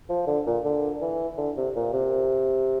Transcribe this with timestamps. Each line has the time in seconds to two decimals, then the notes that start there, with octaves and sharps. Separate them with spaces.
0.09 F3
0.27 D3
0.46 A#2
0.65 D3
1.01 E3
1.38 D3
1.57 C3
1.76 A#2
1.93 C3